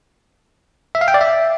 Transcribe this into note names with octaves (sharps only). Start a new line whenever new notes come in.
E5
F5
G5
D5
E5